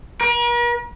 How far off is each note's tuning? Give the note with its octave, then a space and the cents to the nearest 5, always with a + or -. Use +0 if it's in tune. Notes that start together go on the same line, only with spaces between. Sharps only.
A#4 +45